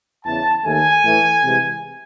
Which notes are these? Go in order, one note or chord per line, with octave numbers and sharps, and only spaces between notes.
E2 C#3 E3 A5
D#2 D#3 A3 G#5
A2 E3 A3
C3 E3 G#3